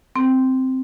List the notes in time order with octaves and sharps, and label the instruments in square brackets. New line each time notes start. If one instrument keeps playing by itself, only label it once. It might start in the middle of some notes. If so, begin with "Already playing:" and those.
[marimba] C4